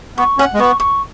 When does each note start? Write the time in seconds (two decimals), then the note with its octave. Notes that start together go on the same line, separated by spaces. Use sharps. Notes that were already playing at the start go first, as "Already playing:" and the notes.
0.18 B3 C#6
0.38 C#4 F#5
0.54 G#3
0.59 B3 C#6
0.80 C#6